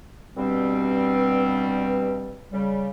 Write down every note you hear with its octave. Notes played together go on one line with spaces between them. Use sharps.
G2 B2 G3 C4
C#3 G3